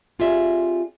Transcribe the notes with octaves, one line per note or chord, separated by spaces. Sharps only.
C4 F4 G4 G#4 D5 E5